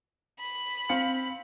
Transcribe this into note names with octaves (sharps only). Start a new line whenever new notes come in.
B5
C4 F5 C#7